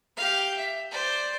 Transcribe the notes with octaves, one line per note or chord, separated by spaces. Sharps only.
G4 F5
E5
C5 D5